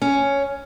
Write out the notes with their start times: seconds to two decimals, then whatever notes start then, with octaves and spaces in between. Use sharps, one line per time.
0.02 C#4